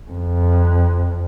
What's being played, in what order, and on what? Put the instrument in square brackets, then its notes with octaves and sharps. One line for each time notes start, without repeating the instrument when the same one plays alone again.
[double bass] F2